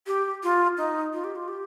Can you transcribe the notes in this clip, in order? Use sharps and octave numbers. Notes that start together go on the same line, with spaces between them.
G4
F4
D#4
F4
G4
F4
G4